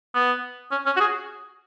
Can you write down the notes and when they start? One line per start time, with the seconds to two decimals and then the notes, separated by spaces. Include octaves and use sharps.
0.15 B3
0.72 C#4
0.86 C#4
0.97 F#4
1.00 G#4